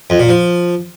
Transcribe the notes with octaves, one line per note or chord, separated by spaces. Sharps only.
F2
A#2
F3